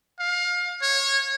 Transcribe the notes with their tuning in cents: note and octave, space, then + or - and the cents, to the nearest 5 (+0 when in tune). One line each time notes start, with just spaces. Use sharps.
F5 +30
C#5 -20